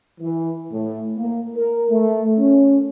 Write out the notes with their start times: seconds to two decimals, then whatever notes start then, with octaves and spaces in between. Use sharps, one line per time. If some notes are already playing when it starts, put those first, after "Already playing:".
0.21 E3
0.72 A2
1.18 A#3
1.56 A#4
1.91 A3
2.39 C#4